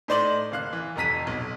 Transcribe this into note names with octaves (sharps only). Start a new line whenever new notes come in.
A2 D#4 C5 D5 C6 F#7
F#1 F5 F#6
E3
F1 F2 A#5 B6 D#7
B1